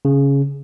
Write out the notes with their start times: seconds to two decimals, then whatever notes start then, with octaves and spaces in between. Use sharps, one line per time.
0.05 C#3